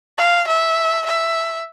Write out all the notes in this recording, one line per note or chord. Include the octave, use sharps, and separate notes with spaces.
F5
E5
E5